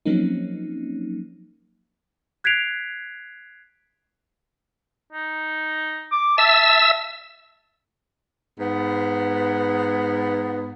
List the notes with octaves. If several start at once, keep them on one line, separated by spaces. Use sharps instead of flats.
F3 F#3 A#3 C4 C#4 D#4
F#6 G#6 B6 C7 D7 F7
D#4
D6
E5 A5 E6
G#2 B3